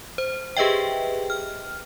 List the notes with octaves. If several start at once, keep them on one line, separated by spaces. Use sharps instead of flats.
C5
G4 G#4 B4 D#5 E5 G5
F6